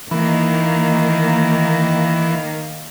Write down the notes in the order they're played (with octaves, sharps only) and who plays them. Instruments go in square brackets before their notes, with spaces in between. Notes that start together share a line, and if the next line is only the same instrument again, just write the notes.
[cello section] D#3 A#3 [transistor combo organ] E3